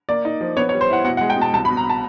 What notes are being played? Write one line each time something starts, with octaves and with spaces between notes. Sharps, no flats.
A#3 D5
D#4
F3
B3 C#5
C#5
G3
C5
E4 F#5
B2 F#5
F#5
G#3
G5
B2 A5
C2 A5
B5
B2
A#5
A5